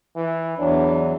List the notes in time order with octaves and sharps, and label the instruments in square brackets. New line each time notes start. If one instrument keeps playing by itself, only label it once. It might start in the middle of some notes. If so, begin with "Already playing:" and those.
[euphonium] E3
[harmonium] E2 E3 F#3 [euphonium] D4